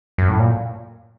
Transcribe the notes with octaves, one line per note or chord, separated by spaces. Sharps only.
F#2
A2
A#2